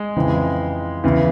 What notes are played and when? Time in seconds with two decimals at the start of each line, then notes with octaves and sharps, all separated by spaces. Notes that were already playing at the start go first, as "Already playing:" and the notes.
Already playing: G#3
0.16 F2 C#3 E3
1.04 E2 C#3 E3